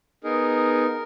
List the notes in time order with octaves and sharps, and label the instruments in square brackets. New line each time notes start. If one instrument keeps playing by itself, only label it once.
[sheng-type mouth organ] B3 D#4 G#4 A#4